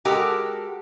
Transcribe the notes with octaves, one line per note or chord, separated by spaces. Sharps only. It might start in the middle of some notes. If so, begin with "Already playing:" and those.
G#3 F#4 G4 A4 A#4